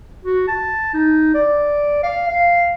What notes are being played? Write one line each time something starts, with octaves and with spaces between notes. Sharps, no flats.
F#4
A5
D#4
D5
F5
F5